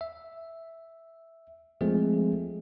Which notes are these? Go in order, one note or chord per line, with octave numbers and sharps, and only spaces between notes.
E5
F3 G#3 A3 C4 G#4